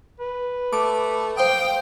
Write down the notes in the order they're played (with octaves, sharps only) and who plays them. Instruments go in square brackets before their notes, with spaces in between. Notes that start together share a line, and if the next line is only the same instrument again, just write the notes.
[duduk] B4
[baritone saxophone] A3 [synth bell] D6
[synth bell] C5 F5 D#6 [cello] G5